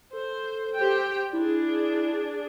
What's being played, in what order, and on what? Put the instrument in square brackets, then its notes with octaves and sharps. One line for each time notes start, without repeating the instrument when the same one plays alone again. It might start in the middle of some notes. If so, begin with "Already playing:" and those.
[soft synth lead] A4 [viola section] C5
[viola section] G4 C5 G5
[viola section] D4 G#4 [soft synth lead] E4